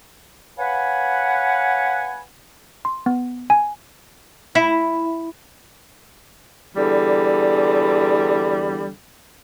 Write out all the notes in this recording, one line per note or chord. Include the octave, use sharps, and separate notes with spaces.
B4 C#5 F5 F#5 G#5 B5
C6
B3
G#5
E4
E2 D3 G3